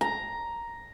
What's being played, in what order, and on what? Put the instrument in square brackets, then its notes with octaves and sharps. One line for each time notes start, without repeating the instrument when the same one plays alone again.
[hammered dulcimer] A#5